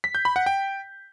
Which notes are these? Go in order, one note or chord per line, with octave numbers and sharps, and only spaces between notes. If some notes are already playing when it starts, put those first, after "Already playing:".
B6
G6
B5
F#5
G5